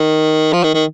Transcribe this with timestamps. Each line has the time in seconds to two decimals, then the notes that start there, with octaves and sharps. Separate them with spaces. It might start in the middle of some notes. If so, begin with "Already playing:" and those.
Already playing: D#3
0.53 F3
0.64 D#3
0.74 D#3